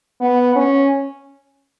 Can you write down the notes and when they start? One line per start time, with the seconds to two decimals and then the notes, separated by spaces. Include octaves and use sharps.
0.21 B3
0.56 C#4